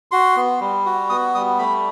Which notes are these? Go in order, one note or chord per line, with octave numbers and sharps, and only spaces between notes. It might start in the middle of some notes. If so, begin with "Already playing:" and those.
F#4 C6
B3
G3
F#4
B3 D#6
G3 D#6
A3 B5